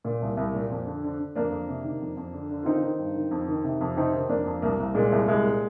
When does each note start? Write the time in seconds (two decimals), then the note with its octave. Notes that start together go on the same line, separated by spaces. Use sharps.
0.05 A#2
0.22 C2
0.37 C2
0.54 A#2
0.70 F2
0.86 D3
1.04 D3
1.19 D3
1.35 F2 A#3 D4
1.52 F2
1.69 C3
1.84 D#3
2.01 F2
2.17 F2
2.33 D3
2.50 D3
2.63 F4
2.66 D#3 C4 D#4
2.83 D#3
2.99 G2
3.16 D#3
3.31 F2
3.48 D#3
3.64 C3
3.81 F2
3.96 C3 C4 D#4
4.14 D#3
4.29 F2 A#3 D4
4.47 F2
4.62 C2 A#3
4.79 C2
4.95 A#2 G#3
5.12 C2
5.28 C2 G#3
5.44 A#2